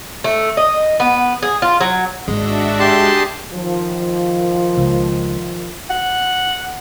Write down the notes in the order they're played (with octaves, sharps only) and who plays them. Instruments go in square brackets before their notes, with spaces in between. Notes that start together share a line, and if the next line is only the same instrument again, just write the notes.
[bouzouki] A3
D#5
B3
G#4
F4
F#3
[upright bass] G#1 G#2 [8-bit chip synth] G#3 [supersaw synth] D4 F#4 E5
[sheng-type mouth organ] G4 A5 C6 [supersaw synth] G#4
[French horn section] D#3 F3
[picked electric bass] C#2
[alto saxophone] F#5